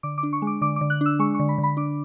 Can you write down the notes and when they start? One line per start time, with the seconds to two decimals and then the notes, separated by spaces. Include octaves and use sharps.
0.03 D3 D6
0.18 D6
0.23 D4
0.33 C#6
0.42 G#3
0.47 D6
0.61 D3 D6
0.76 D6
0.81 D3
0.90 F#6
1.01 D4 E6
1.19 G#3 C#6
1.35 C#6
1.39 D3
1.49 B5
1.58 D3
1.63 B5
1.77 D4 D6